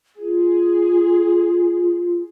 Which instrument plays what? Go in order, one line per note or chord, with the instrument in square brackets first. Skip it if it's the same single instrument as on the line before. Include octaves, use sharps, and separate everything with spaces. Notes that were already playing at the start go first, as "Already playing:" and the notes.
[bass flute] F4 [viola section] G#4